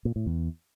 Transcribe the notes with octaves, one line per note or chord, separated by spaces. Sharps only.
A#2
A2
E2